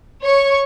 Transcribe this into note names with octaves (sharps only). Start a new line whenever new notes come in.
C#5 C#6